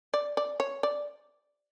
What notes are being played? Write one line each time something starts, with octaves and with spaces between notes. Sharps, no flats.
D5
D5
C#5
D5